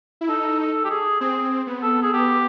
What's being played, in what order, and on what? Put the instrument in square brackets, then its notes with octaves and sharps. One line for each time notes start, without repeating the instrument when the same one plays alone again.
[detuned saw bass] E4
[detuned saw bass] D#4 [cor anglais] A4
[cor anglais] A4
G4
G#4
[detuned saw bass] C4 [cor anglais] G#4
[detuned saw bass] B3
[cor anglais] A4
G#4
[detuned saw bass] B3 [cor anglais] G4